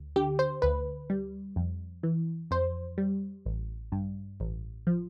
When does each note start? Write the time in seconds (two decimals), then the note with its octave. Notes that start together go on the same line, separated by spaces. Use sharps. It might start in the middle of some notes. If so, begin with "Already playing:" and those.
Already playing: D2
0.16 D3 G4
0.39 C5
0.62 D2 B4
1.10 G3
1.56 F2
2.03 E3
2.51 F2 C5
2.98 G3
3.46 A1
3.92 G2
4.40 A1
4.87 F3